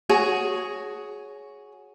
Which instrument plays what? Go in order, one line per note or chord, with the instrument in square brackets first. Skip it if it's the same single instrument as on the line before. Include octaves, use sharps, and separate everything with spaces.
[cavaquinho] F#4 G#4 C#5